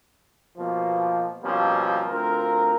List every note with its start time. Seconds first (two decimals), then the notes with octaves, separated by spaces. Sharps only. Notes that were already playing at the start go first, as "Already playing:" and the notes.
0.57 B2 F3 A#3
1.43 B2 F3 G3 A#3 C4 C#4
2.08 D2 C4 F4 A#4